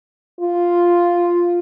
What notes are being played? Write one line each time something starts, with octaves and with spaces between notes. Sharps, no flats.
F4